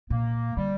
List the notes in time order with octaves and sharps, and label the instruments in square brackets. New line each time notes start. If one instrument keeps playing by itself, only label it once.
[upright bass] A#2 [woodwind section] A#3
[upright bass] D3 [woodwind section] G3